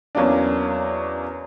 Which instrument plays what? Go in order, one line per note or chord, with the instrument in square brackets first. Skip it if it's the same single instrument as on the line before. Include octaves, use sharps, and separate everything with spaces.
[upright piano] E2 F#3 A#3 C#4 D4